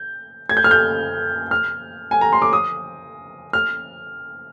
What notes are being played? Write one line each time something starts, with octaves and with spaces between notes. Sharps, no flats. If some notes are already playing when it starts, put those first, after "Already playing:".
Already playing: G6
G#6
G6
F6
G6
F6
G#5
A#5
C6
D6
D#6
F6